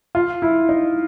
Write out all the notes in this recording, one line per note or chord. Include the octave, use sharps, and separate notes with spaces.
F4
E4
D#4